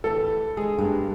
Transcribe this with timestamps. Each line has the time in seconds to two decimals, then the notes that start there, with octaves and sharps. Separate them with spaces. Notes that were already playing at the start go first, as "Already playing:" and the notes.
0.04 A2 E3 G4 A4
0.57 G#3 D4 G#4
0.79 G2 G#3 A#3 B3